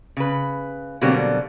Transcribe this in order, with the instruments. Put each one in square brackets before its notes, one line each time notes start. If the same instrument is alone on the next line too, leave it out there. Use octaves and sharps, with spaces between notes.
[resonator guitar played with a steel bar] C#3 B4
B2 D3 F#3 G3 A#3 C4